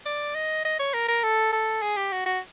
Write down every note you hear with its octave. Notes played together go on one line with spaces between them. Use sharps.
D5
D#5
D#5
C#5
A#4
A#4
A4
A4
G#4
G4
F#4
F#4